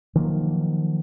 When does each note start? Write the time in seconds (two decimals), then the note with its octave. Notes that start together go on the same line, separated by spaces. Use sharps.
0.15 D#3 F3 F#3 A#3